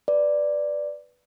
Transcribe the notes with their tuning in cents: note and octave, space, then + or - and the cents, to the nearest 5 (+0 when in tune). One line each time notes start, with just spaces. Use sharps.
B4 +0 D5 +0